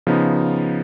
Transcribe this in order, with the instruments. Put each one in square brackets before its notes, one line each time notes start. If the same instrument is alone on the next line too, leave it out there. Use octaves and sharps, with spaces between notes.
[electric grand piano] C#3 F3 B3 D#4